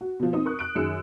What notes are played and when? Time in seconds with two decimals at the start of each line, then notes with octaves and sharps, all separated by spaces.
0.01 F#4
0.20 B2 F3
0.33 C4 D#4 D#6
0.45 A#4 C#6 F#6
0.59 F#6 D7
0.75 F#2 D#3 G#4 E6 C#7